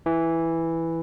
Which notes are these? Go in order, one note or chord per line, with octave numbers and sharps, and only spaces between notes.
E3